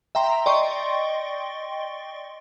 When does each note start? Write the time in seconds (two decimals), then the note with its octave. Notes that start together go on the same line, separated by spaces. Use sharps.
0.15 E5 G5 A#5 C6
0.46 D5 D#5 G5 C6 C#6